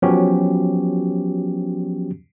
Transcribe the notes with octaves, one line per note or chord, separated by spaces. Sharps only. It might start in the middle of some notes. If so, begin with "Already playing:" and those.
F3 F#3 B3 C#4 F#4 G4